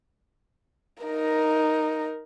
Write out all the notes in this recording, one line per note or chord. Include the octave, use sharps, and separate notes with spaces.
D#4 A#4